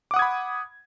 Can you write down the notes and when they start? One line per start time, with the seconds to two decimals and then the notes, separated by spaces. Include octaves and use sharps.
0.11 D6
0.14 F#5
0.16 D#6
0.19 G#6
0.22 B5